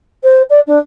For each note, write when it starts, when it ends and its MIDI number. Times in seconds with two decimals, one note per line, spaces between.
0.23 0.42 72
0.49 0.60 74
0.66 0.78 62